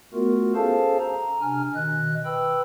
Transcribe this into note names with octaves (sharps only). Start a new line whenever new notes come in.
A3 B3 F4 F#4 A#4
C#4 G#4 A4 C5 F5 A5
A#5
C3 D4 G#5 F6
B2 D#3 D#5 F#6
B4 G5 B5 E6